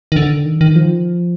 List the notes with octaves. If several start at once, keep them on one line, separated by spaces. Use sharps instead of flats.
D#3
D3
D#3
D#3
F3